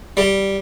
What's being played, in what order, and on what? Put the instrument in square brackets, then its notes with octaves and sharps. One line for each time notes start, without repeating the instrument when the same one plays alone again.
[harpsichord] G3